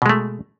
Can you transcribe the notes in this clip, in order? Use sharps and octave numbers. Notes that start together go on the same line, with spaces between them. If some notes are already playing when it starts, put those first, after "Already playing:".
B2 G#3 A3